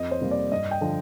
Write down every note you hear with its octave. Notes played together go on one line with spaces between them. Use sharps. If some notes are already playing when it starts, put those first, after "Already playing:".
Already playing: F2 D#5
C5
C3 G3 A#3
D5
G2 D#5
G5
D3 F3